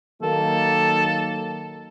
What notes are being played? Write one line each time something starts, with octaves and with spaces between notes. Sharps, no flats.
D#3 F#3 A#3 A4